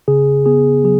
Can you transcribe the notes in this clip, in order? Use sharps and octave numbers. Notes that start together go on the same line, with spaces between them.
C#3 G#4
B3 G#4
F#3 G#4